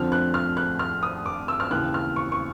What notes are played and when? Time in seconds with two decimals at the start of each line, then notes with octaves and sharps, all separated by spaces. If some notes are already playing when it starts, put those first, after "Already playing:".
Already playing: F2 D3 F3 F6
0.12 F#6
0.34 F6
0.57 F#6
0.79 F6
1.03 D#6
1.26 D6
1.48 E6
1.60 F6
1.71 D#2 C#3 E3 F#6
1.94 F6
2.16 C#6
2.32 C#6